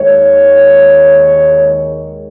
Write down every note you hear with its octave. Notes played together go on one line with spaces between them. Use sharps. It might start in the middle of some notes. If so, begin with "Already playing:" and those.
Already playing: D#2 D#3 G#3 C#5